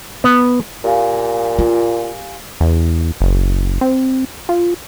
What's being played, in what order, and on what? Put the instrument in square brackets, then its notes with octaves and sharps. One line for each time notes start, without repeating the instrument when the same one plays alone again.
[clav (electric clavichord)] B3
[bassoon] A#2 [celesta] G4 F5 G#5
[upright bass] F4
[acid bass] E2
F#1
C4
F4